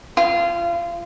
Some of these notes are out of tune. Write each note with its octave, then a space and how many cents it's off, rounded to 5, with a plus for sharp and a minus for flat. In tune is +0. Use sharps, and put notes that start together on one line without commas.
F4 -30